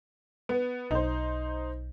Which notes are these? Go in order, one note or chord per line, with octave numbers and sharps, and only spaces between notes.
B3
B1 D#4 C5